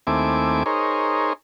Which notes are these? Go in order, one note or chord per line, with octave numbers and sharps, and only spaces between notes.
D#2 A3 C4 E4 G#5 D6
D#4 G#4 A#4 C5 C#5